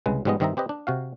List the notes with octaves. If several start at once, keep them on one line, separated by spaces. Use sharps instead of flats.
C2 C#3 G#3 B4
G#2 F3 G3 G#3 B3 D#5
G2 D#3 C4 D#5 E5 A#5
C4 G4 B4 D#5
D4
C3 F#4 F5